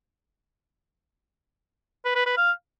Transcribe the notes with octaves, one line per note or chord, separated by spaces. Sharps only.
B4
B4
B4
F5